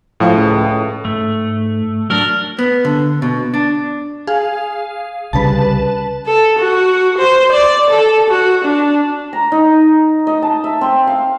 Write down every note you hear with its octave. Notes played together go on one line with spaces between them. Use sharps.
A2 F3
C#2
G#2 A3
F#3 D4 A#4
B3
D3
B2
D4
G#4 F5
C2 C#3 G3 B4 A5
A4
F#4
C5
D5
A4
F#4
D4
A#5
D#4
D#5
A5
E5
C4
F5